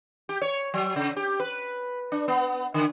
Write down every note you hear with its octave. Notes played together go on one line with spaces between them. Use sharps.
G4
C#5
F#3
C#3
G4
B4
D4
B3
D3